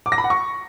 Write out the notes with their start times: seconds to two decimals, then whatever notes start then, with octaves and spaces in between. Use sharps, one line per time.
0.06 D6
0.12 A#6
0.18 B5
0.24 F#5
0.30 C#6